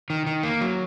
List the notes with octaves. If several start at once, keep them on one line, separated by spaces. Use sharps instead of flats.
D#3
D#3
A#3
F#3